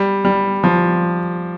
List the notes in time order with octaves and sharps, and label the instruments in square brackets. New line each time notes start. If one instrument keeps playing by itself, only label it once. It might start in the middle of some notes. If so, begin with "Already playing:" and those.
Already playing: [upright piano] G3
G3
F3